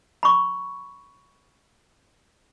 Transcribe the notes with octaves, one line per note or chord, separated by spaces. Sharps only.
B5 C#6